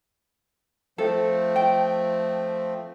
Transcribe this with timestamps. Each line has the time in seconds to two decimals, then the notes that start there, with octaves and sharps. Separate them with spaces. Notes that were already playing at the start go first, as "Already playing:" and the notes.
0.98 F3 A3 C4 A4
1.56 G5